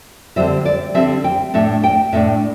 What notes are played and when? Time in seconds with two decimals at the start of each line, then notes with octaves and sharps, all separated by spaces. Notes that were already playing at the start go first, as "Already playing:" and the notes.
0.36 D3 G3 C4 E5
0.65 D5
0.94 D3 G3 C4 E5
1.24 G5
1.54 A2 A3 D4 E5
1.84 G5
2.13 A2 A3 D4 E5